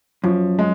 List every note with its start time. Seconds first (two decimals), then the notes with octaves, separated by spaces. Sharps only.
0.24 F#2 F3
0.59 G#3